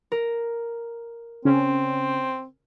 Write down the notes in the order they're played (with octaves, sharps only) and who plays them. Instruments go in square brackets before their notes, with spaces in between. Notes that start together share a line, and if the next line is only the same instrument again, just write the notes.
[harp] A#4
[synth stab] C#3 C#4 [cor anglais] C4